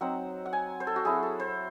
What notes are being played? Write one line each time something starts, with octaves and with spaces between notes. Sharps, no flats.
F#3 C4 D#4 F#5
F#5
G#5
C5
A4
F#4
F#3 C4 E4 G#4
A4
C5